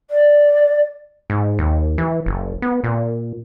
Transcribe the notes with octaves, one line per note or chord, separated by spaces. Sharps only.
D5
G#2
D#2
E3
F#1
B3
A#2